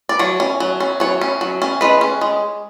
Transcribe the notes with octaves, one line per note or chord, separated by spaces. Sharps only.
D5
F#3 C#5
C#4
F#3
C#4
F#3 C#5
C#4
F#3
C#4
G#3 B4
C#4
G#3